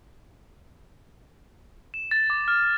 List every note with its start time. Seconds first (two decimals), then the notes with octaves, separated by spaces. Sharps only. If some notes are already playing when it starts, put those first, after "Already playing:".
1.94 E7
2.11 A6
2.30 D6
2.48 F6